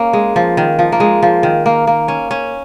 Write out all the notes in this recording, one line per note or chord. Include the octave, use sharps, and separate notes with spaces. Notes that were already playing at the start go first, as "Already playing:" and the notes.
Already playing: A#3 C#4
G#3
F3
D#3
F3
A#3
G#3
F3
D#3
A#3
A#3
C#4
C#4